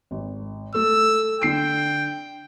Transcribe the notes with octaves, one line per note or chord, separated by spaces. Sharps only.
G#1
A3 E6
D3 G5 C7 D7